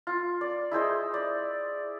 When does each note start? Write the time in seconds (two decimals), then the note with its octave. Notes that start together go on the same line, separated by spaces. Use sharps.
0.07 F4
0.41 D5
0.71 E4 G#4 C5 D#5
1.14 D5